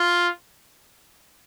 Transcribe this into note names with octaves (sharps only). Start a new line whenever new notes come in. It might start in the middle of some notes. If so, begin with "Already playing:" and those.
Already playing: F4